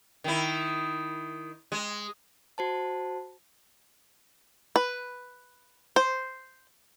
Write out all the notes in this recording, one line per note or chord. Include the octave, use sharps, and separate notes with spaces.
D#3 E4
G#3
F#4 C5 A5
B4
C5